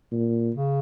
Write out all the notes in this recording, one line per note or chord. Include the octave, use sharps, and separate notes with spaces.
A#2
C#3